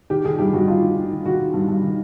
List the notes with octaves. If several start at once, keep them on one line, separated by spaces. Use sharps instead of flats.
D#3 G4
D#3 G#4
G2 G4
G2 F#4
G2 F4
D#3
D#3
D#3
D#3 F#4
D#3
G2
G2
D#3